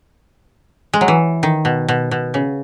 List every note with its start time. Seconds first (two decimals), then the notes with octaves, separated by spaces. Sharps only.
0.93 G#3
1.01 F#3
1.08 E3
1.43 D#3
1.65 B2
1.88 B2
2.11 B2
2.34 C#3